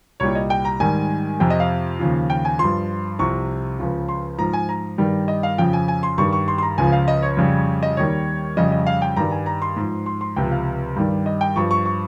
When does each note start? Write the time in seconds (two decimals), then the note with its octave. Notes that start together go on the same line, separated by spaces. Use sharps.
0.20 C2 A#2 G3 C#5
0.35 D#5
0.50 G5
0.65 A#5
0.80 G#2 D#3 G3 G#5
1.40 F2 C3 F3 G5
1.50 D#5
1.60 F5
1.99 D#2 C#3 F3
2.30 G5
2.45 G#5
2.59 G2 F3 C6
3.19 C2 C3 F3 C#6
3.79 C#2 C#3 F3
4.09 C6
4.38 G#2 F3 A#5
4.53 G#5
4.69 A#5
4.98 G2 D#3 G3
5.28 D#5
5.43 F5
5.58 F2 C#3 F3 G5
5.73 G#5
5.88 G#5
6.03 C6
6.18 G2 D#3 G3 C#6
6.33 C#6
6.48 C6
6.58 C6
6.63 A#5
6.78 C#2 C#3 F3 G#5
6.92 F5
7.08 D#5
7.22 C#5
7.37 F2 C#3 G3
7.83 D#5
7.97 D#2 D#3 G3 C#5
8.57 F2 C#3 G3 D#5
8.72 D#5
8.87 F5
9.02 G5
9.17 G2 D#3 G3 A#5
9.32 G#5
9.46 A#5
9.62 C6
9.76 G#2 F3
10.06 C6
10.21 C6
10.36 C#2 C3 F3 G5
10.52 F5
10.96 G2 D#3 G3
11.26 D#5
11.41 G5
11.56 G2 F3 C#6
11.71 C#6
11.86 C#6